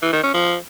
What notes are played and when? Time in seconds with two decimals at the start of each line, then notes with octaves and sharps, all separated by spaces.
0.02 E3
0.13 D#3
0.23 C#4
0.34 F3